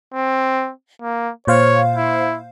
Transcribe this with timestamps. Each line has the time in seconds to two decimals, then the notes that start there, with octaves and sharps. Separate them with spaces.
0.14 C4
1.02 A#3
1.47 A#2 C5 C#5 F5
1.96 E4